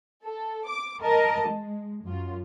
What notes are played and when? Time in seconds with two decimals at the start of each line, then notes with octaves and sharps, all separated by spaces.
0.24 A4
0.68 D6
1.02 A#4 D#5 A5
1.48 G#3
2.04 F#2 F4